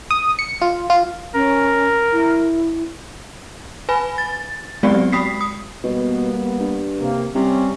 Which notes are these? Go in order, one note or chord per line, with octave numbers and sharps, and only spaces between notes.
D#6
C#7
F4
F4
C#4 A#4
E4
B4 G#5 B5
A6
F#3 G#3 B3 C4 G4 D5
G#3 B5 D#6 B6 C7
D#6
B2 G3 A#3 B3
G2
C3 A#3
C3 G3 C#4